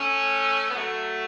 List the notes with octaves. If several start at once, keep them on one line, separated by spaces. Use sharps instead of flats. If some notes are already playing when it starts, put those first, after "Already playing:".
Already playing: A3 C#4
B3
F#3 A3